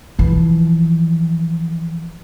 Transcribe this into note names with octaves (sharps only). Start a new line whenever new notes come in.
E3 F3